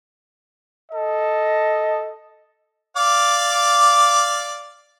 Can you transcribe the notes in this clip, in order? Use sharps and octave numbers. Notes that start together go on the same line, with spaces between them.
A4 D#5
D5 F5 D6